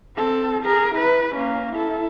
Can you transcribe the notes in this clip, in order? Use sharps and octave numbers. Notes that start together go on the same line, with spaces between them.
C4 A4
G#4 A#4
E4 B4
A#3 C#4
E4 A4